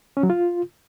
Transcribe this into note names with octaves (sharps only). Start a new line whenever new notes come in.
C#4
F#3
F4